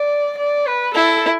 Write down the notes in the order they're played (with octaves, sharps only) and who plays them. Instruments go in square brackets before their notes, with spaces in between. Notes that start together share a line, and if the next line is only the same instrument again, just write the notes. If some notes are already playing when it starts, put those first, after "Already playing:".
Already playing: [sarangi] D5
D5
B4
[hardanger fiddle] E4 [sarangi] A4